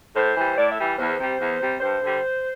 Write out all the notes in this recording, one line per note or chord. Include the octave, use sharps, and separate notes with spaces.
A2 C5
E3 G3
A2 D5
E5
E3 G3
E2 C5
C3 G3
E2
C3 G3
G2 C5
D3 G3